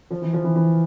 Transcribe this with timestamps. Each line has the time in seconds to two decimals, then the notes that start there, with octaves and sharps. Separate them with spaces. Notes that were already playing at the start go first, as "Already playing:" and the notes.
0.11 F3
0.22 E3
0.33 F3
0.44 E3
0.56 E3